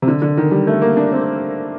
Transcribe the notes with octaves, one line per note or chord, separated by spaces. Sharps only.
C3
D3
D3
D#3
G3
A3
A#3
D4
C4